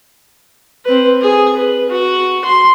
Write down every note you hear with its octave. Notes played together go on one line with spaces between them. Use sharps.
C4 B4
G#4
B4
F#4
C6